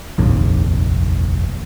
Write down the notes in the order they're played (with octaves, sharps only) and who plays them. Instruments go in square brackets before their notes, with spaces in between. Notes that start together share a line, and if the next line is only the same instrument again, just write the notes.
[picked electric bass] F1 A#1 D#2